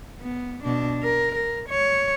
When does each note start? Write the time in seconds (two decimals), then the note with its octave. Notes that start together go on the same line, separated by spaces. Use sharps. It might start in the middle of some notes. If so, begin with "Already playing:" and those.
0.21 B3
0.64 B2 D4
1.03 A#4
1.35 A#4
1.69 C#5